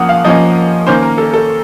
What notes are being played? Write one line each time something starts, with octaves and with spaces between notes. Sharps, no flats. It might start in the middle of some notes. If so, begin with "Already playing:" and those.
Already playing: F3 A#3 C#4 F#5 D#6
F5
F3 A#3 C#4 D#5
D#3 A#3 C#4 C5
A#4
A4
A4